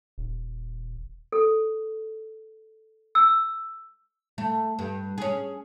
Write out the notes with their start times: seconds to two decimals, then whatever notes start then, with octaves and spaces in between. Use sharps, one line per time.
0.18 D#1
1.32 A4
3.15 E6
4.38 A3
4.79 G2
5.18 C#4 G#4